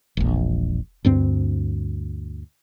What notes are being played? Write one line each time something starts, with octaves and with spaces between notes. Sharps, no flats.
E1 A#1
D2 G2 C4